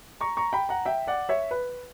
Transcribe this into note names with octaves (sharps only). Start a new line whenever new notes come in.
A#5 C#6
A#5 C#6
G5 B5
F#5 A#5
E5 G5
D5 F#5
C#5 E5
B4